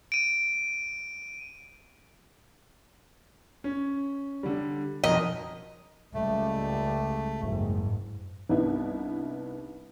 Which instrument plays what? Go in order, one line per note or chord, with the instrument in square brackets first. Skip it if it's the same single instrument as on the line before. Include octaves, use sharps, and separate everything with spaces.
[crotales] D7 D#7
[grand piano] C#4
D3 G3
[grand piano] B1 F2 A#4 [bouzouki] D#5
[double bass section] C#2 G3 [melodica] A3
[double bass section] F#1 G#2
[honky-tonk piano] C2 G2 B3 D#4 E4